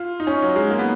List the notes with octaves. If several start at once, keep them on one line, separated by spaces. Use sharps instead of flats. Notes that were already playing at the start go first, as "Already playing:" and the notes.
Already playing: F4
D#4
C#4
F#3
G#3
A#3
B3